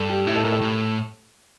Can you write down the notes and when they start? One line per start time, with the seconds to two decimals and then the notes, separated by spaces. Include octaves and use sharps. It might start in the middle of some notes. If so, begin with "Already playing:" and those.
Already playing: G2 A4
0.10 G4
0.27 A2 E4
0.36 A4
0.44 A2 A#4
0.52 A4
0.61 A2